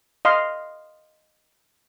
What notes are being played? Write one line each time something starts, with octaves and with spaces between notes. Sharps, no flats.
D#5 F5 C6